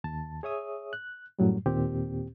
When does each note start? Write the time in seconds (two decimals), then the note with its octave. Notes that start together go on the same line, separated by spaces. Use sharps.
0.04 D#2 A5
0.43 G#4 C#5 E5 D#6
0.93 F#6
1.39 F#2 A2 F#3 G3
1.66 D#2 A#2 C4 G4